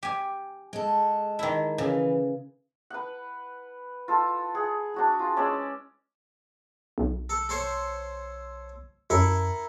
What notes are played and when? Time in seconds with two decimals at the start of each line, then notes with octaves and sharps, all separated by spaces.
0.03 G4 G#5
0.73 G#3 A4
1.39 D#3 E4
1.78 C#3 E3
2.90 B4 F#5
4.08 F4 A4
4.54 G#4 F#5
4.94 D4 F#4 G#4
5.19 F4
5.36 G#3 C#4 D5 E6
6.98 B1
7.29 A4
7.49 A4 C5 C#5
9.10 F#2 E4 A4 A#4